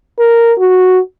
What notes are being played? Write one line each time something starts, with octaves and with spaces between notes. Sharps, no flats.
A#4
F#4